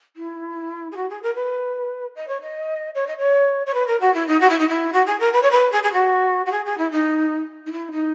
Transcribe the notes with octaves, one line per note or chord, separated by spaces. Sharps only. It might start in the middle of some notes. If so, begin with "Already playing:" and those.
E4
G#4
F#4
G#4
A#4
B4
D#5
C#5
D#5
C#5
D#5
C#5
C#5
B4
A#4
F#4
E4
D#4
F#4
E4
D#4
E4
F#4
G#4
A#4
B4
C#5
B4
G#4
G#4
F#4
F#4
G#4
G#4
E4
D#4
D#4
E4
D#4